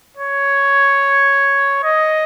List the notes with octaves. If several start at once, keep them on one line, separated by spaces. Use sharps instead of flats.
C#5
D#5